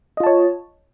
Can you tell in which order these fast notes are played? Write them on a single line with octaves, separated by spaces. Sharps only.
D#5 F4 A5 C#5